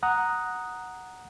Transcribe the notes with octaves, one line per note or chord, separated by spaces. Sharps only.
F#5 A#5 D#6 F#6